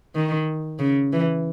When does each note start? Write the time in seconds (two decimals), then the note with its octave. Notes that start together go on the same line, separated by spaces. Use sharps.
0.15 D#3
0.79 C#3
1.13 E3